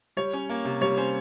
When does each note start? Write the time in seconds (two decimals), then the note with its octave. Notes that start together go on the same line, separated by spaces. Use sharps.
0.17 G3 C#5
0.34 C#4
0.50 A#3
0.65 C3
0.81 G3 C#5
0.97 C#4 C5